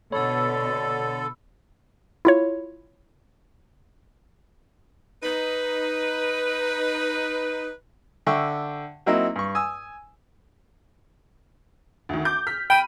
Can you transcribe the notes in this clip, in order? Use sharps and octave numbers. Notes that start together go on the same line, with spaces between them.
B2 D3 A4 C#5 B5 E6
E4 F4 C#5
D#4 B4
D3 E5 G5 C#6
F#3 A#3 C4 D#4 E4
G2 C#6
G#5 D#6 E6
D2 D#3
D6 G6
F6 B6
G5 B5 D#7